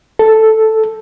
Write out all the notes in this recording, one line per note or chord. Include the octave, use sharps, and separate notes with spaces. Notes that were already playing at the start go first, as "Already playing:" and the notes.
A4